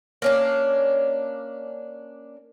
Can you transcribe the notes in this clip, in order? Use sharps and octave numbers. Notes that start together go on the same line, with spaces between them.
A#3 C#4 D4